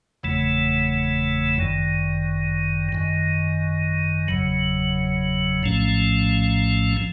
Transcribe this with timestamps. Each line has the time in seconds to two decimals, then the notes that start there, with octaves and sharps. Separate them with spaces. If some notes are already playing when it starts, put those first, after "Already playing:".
0.23 F#1 E2 C#3 E3 A3
1.59 G1 F#2 D#3
2.92 G#1 F#2 D#3
4.28 F#1 E2 C#3 F#3
5.63 A#1 A2 F3 A3 C#4
6.97 F3